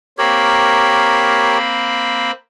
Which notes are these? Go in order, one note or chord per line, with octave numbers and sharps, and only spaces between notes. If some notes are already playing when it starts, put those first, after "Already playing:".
A#3 C4 G4 A#4 C#5 B5